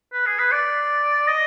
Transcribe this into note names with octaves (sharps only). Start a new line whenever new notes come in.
B4
G#4
B4
D5
D#5